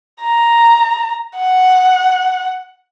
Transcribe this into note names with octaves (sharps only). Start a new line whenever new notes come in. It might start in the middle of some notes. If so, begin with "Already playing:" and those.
A#5
F#5